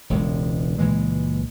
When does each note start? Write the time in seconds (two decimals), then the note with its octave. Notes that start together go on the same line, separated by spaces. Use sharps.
0.10 E1 C#2 G#3
0.78 C#2 A#2 E3 G#3